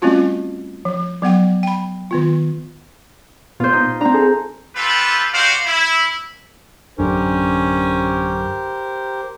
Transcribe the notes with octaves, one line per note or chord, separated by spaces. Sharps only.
G3 A3 C4 C#4 F4 F#4
F3
F#3 B3 F#5 G5
G5 B5
D#3 B3 F4
A#2 B3 F4 C5
D#4
C4 D4 A#5
G#4 A4
C4 F4 G4 A4 B4
F#4 G4 A#4 C5 D5 F5
E4
A1 F#2 D3 C#4 G4 A#4 C5